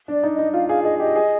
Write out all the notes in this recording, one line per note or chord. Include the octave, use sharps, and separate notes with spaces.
D4 D5
D#4
D#4 D#5
F4 F5
G#4 F5
G#4 D#5
G4 D#5
G#4